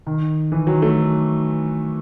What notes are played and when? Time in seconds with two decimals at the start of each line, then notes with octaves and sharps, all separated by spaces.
0.07 D#3
0.52 E3
0.67 D#3 F#3
0.82 F#3 A3